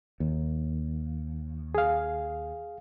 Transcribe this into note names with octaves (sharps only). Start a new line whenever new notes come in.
D#2
G#4 F5